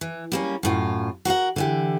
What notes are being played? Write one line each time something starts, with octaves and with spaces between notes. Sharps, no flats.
E3
G3 A#3 C#4
F#2 A2 F4
F#4 A#4 F5 F#5
D3 E3 G4